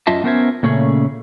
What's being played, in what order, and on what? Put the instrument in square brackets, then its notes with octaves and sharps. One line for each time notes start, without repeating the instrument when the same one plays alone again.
[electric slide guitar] F#2 F4 D#5 E5 A5
B3 C#4 A#4 C5 E5 G#5
A#2 C#3 A3 C#4 G#4